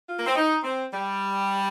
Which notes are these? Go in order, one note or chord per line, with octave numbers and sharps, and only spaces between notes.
F4
A#3
C4
D#4
C4
G3